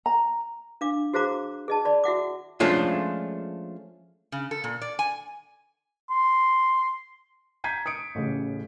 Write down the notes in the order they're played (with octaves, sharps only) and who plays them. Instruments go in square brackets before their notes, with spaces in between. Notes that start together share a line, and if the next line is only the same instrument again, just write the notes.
[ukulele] A#5
[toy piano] D4 F5 D6
F#4 G#4 C5 F5 A#5 D6
G#4 D#5 A5
D5 B5
F#4 E5 F#5 D6
[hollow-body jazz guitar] F3 G#3 A3 C#4 D4 F4
[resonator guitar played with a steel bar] C#3
A4
A#2
D5
G#5
[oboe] C6
[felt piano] A#5 G6 G#6 B6 C7 D#7
D#6 C#7 D7
A1 A2 C#3